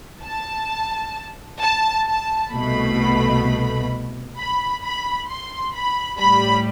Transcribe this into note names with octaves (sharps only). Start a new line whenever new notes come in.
A5
A5
A5
C2 B2 A3 B5
B5
B5
C6
B5
A2 G3 B5